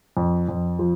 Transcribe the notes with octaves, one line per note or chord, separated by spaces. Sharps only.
F2
F2
F3